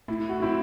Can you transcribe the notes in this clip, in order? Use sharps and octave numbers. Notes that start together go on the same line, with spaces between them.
A2 E4
F#4
F#3 C4 E4